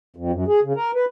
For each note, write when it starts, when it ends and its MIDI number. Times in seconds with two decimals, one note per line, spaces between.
0.16 0.31 41
0.32 0.44 42
0.48 0.60 68
0.63 0.73 49
0.76 0.91 70
0.95 1.05 71